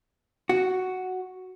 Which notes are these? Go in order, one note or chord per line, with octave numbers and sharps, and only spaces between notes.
F#4